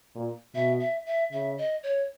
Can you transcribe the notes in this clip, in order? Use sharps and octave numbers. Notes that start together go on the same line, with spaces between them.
A#2
B2 E5
E5
E5
C#3 E5
D#5
C#5